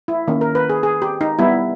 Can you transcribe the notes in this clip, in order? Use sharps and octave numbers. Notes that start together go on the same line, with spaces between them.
E4
D#3 A#3 C#4
A#4
B4
G#4
G#4
G4
D#4
G3 B3 E4